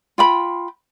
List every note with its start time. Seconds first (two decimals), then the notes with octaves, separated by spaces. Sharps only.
0.18 F4 G5 B5